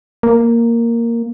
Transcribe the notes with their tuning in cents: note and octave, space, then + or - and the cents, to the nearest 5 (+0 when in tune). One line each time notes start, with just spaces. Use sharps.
A#3 -5